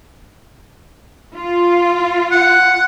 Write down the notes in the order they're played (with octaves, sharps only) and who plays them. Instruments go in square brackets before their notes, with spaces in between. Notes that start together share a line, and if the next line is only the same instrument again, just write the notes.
[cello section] F4
[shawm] F#5